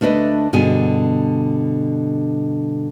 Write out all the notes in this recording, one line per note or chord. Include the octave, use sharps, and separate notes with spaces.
D2 A3 D4 B4 D#5
G2 B2 D3 G#4 G#5